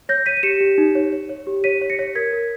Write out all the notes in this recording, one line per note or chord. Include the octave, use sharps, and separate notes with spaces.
C#5 G6 A#6
C#5 B6 D#7
D#7
G4 C#7 E7
G4
D#4
C#5
C#5
C#5
G4
C#5 B6 D#7
C#5
A#6 C#7
C#5
A#4 G#6 B6
A#4